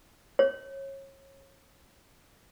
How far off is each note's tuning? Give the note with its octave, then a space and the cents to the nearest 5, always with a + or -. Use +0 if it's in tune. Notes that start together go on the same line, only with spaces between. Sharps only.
C#5 -30